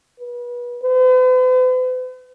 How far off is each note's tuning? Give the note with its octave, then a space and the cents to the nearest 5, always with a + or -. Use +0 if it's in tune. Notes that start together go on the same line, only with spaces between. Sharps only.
B4 -30
B4 +45